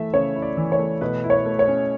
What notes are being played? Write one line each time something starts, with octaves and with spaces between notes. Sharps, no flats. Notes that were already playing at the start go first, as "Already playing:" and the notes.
Already playing: E3 A3 E5
C#3 C#5
E4
D5
E3
C#5
A3
B2 B4
E4
C#5
A3
C#5
C#4